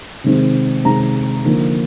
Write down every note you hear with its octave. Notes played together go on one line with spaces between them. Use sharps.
C3 D#3 G#3 C4
C3 D#3 G#3 C4 A#5
D3 F3 A#3 D#4